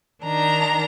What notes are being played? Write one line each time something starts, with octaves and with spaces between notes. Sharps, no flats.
D#3 D4 A#5